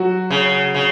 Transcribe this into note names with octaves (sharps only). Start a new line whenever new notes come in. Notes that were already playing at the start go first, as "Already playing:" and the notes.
Already playing: F#3 F#4
C#3
C#3